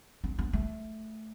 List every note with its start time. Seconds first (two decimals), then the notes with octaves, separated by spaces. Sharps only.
0.24 C4
0.39 B3
0.53 A3